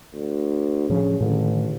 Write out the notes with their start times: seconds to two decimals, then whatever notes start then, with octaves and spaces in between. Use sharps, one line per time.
0.14 D2
0.89 A2 C#3 F3
1.20 A1 A2 D3 D#3